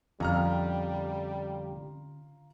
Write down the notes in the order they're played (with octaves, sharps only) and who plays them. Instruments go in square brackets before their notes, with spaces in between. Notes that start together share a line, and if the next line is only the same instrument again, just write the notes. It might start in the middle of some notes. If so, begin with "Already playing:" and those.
[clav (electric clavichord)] F2 [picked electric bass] D3 C#4 [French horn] G3 [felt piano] F4 A#5 F6